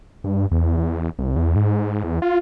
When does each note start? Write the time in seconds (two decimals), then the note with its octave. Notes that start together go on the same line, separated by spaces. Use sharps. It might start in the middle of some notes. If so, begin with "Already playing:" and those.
0.24 G2
0.51 E2
0.77 E2
1.19 C2
1.36 E2
1.56 G#2
2.04 E2
2.22 F4